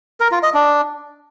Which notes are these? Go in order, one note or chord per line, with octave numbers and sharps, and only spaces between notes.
A#4
F4
D#5
D4